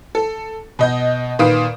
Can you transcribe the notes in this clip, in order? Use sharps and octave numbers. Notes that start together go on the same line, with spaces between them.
A4
B2 D#5 G6
A#2 D#3 B4 F5 D#6 D7